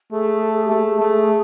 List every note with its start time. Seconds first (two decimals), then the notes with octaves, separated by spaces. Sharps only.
0.12 A3 G#4
0.41 A4
0.54 G#4
0.65 G4
0.70 A3
0.77 G#4
1.00 A3